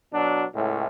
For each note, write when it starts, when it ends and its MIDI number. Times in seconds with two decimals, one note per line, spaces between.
0.13 0.43 47
0.13 0.43 54
0.13 0.43 62
0.53 0.86 37
0.53 0.86 45